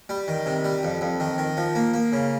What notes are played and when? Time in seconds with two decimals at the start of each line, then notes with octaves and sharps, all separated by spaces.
0.09 G3
0.28 D#3
0.46 C3
0.64 G3
0.83 F2
1.01 F2
1.20 D#3
1.38 D#3
1.57 F3
1.75 A#3
1.94 A#3
2.13 C#3